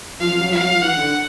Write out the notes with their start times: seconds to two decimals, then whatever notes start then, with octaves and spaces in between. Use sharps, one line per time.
0.20 F3 F5
0.31 F3
0.41 F#3
0.51 F3 F5
0.62 F#3
0.72 F3
0.81 E3 F#5
0.97 D3